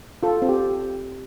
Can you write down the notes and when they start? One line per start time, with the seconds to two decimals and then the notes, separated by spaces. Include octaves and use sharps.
0.23 F4 A4
0.42 C4
0.49 G4